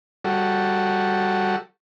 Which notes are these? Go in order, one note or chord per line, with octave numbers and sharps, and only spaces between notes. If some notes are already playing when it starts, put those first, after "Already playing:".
G3 F#4 A4